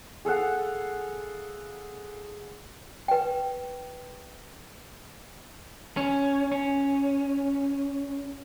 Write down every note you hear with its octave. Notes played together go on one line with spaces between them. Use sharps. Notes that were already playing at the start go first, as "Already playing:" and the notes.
G#4 A4 F5 F#5
B4 G5
C#4
C#4